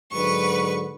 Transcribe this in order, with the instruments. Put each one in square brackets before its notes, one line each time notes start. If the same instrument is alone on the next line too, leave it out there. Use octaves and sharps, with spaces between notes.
[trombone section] G#2 D3 F#3 [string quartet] B4 C#6